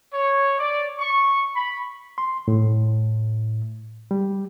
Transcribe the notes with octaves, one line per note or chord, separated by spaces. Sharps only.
C#5
D5
C#6
B5
C6
A2
G3